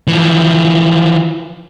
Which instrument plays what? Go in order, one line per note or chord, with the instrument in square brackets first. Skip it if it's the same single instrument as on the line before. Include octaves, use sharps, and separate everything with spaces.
[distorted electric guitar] E3 F3